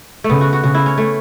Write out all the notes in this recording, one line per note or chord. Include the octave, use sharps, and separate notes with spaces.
A3
C#3 B3
F#4
F#4
C#3 F#4
E4
C#4
A3